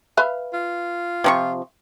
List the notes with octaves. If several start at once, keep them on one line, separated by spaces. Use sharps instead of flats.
B4 E5 F5
F4
C3 F3 C#6